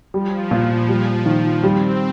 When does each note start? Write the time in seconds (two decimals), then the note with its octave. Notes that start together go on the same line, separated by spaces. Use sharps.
0.14 F3 G3
0.51 A#2
0.89 G3
1.26 D#3
1.63 G3 C4